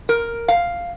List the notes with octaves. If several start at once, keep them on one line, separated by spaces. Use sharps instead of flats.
A#4
F5